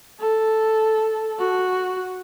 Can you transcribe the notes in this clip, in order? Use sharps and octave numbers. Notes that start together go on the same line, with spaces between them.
A4
F#4